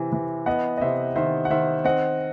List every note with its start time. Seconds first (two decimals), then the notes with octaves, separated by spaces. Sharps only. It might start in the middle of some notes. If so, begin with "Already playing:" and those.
Already playing: C3 E3
0.13 E3
0.46 B3 D#5 F#5
0.78 D#5
0.81 C3 C5 E5
1.16 D#3 C5 E5
1.45 F#5
1.50 D#3 C5 E5
1.85 C4 D#5 F#5